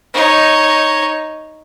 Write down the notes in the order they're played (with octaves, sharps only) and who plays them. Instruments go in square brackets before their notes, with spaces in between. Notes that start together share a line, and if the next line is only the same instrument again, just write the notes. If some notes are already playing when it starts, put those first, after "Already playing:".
[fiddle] D#4 C#5